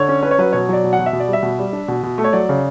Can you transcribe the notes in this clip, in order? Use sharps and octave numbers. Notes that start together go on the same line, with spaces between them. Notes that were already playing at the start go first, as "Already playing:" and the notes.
Already playing: D3 C#5
C#4
C#4 B4
C#5
F#3 B4
B2 C#5
F#3 D5
B2
F#5
B2
E5
B2
D5
G3
E5
B2
G3
D4
B2
B2
A3
C#5
F#3 D5
C#3